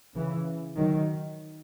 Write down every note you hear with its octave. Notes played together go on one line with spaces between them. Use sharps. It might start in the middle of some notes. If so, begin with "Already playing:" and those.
C#3 E3
D#3 F#3